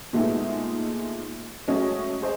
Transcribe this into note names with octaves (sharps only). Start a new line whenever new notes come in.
A#2 G#3 A3 B3 D#4 E4
F#3 G#3 A3 C#4 D#5
G#4 C5 D#5